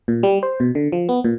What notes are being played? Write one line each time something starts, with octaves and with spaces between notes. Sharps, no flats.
A#2
G3
C5
B2
D3
F3
B3
A#2